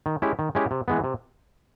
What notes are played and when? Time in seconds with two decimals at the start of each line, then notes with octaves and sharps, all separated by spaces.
0.06 D#3
0.22 G#3 C#4 E4 G4
0.39 D#3
0.55 G#3 C#4 E4 G4
0.71 C3
0.88 E3 G#3 B3
1.04 C3